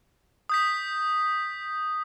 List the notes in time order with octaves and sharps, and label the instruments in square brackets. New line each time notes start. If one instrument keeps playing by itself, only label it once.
[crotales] D#6 G6 B6